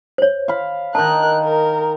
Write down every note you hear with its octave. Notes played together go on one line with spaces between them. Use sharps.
C5 C#5
F5 B5
D#3 D#4 A#4 A5 F#6
A#4